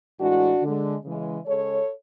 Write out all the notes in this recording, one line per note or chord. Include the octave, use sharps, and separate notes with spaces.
A2 E3 G#3 D4 F#4
D3 G#3
C#3 E3 G#3
C#3 G#3 A4 C#5